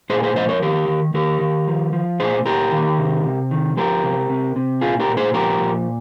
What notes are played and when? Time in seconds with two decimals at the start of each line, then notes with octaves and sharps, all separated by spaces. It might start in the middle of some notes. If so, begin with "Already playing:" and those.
0.10 A#2 G#4 C5
0.19 A#4
0.23 G#4 C5
0.36 F3 C5 D#5
0.49 A#4 C#5
0.62 D#3 G4 A#4
0.88 D#3
1.14 D#3 G4 A#4
1.41 D#3
1.68 F3
1.93 F3
2.20 A#2 G#4 C5
2.45 A#2 G4 A#4
2.72 D#3
2.98 C3
3.24 C3
3.51 D#3
3.77 F3 G4 A#4
4.03 C3
4.29 C3
4.56 C3
4.81 A#2 F4 G#4
5.00 G4 A#4
5.09 A#2
5.17 G#4 C5
5.34 F3 G4 A#4
5.61 A#2